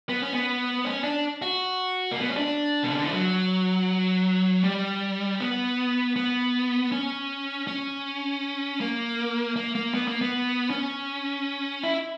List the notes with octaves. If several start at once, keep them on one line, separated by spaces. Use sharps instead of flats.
B3
C#4
B3
C#4
D4
F#4
A#3
B3
C#4
D4
B2
C#3
D3
E3
F#3
G3
B3
B3
C#4
C#4
A#3
A#3
A#3
B3
A#3
B3
C#4
E4